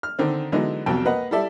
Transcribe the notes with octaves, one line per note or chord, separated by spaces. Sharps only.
F6
D3 D#3 C4
D3 E3 F#3 G#3 B3 D#4
C2 F2 B2 F#3 G5 A5
A#3 B4 D#5 F#5
G3 E4 A4 D5 E5